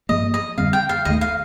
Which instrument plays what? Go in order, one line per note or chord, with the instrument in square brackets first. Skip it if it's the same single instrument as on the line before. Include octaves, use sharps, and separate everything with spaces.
[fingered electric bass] G2 F3 A#3 [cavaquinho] D#5
[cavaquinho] D#5
[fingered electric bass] F2 D3 G3 C4 [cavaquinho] F5
[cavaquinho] G5
F5
[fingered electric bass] D#2 D#3 A3 [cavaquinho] D#5
[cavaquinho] F5